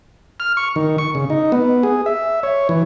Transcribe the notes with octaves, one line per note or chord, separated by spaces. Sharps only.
F6
C#6
D#3
C#6
C#3
D#4
B3
G#4
E5
C#5
E3